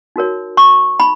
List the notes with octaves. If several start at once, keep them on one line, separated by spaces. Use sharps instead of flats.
D#4 F#4 A#4 C#5
C#6
D#4 B5